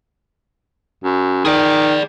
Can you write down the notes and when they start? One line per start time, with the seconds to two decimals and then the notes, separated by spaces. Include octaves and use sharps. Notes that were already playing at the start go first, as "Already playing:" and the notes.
1.04 F#2
1.45 D#3 G#4 D5